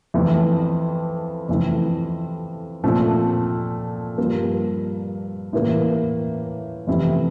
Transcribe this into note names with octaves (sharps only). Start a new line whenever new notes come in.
F2 E3 A3
F2 E3 A3 E4
A#2 F3 A3 C4
G2 F3 A#3
A2 E3 A#3
F2 C3 E3 A3 E4